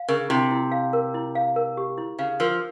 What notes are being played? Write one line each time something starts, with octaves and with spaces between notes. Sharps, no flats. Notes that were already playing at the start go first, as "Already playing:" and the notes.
Already playing: F5
C#3 A#4
C3 E4
E4
F5
A#4
E4
F5
A#4
G4
E4
C#3 F5
F3 A#4